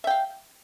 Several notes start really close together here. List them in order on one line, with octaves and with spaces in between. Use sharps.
E5 G5 F5